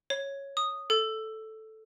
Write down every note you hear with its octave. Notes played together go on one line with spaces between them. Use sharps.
C#5
D#6
A4